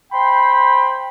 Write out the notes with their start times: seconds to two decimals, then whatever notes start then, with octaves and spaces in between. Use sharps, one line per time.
0.13 C5 G5 B5 C6